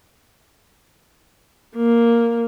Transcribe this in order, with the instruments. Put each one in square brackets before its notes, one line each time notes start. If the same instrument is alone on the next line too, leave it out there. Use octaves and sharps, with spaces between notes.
[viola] A#3